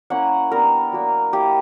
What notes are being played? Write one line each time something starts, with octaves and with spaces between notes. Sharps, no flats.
A#3 C#4 E4 F#5
G3 B3 D4 A#4
F#3 A#3 D4
A#3 E4 G4